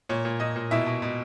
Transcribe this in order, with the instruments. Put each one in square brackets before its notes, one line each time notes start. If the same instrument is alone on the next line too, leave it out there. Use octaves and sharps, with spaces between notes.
[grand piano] A#2 C#5
A#2
A#2 D#5
A#2
B2 E4 E5
B2
B2